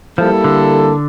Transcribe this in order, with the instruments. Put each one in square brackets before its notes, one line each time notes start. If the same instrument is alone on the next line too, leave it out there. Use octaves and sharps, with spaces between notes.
[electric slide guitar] F3 [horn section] G3 A#3 E4 A4
[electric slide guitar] D3